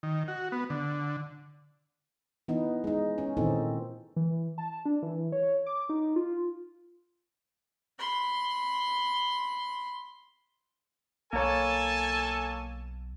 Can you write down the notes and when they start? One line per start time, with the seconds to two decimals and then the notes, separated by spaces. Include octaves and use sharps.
0.03 D#3
0.28 F#4
0.52 B3
0.70 D3
2.48 E3 B3 D#4
2.84 G#3 D#4
3.18 C#4
3.37 A#2 D#3 E3 C4 D#4 A4
4.16 E3
4.58 A5
4.85 D4
5.02 E3
5.32 C#5
5.66 D6
5.89 D#4
6.16 F4
7.99 B5 C6
11.33 B1 A#3 A4 C#5 G#5 A5